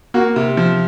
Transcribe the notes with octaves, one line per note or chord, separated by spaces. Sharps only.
A#3 F#4
C3
F3